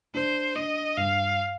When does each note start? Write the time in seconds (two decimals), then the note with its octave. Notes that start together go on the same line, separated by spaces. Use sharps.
0.14 D4 C5
0.55 D4 D#5
0.97 G2 F5